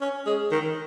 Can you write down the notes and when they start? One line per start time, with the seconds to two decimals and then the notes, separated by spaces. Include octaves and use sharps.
0.01 C#4
0.26 G#3
0.51 D#3